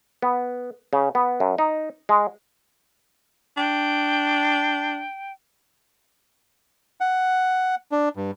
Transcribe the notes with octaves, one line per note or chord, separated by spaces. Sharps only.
B3
C#3
B3
F#2
D#4
G#3
D4 G5
F#5
D4
G2